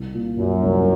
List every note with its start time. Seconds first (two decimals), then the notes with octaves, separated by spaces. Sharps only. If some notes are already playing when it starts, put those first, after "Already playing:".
Already playing: C2
0.14 A#2
0.38 F#2 A#2
0.63 C2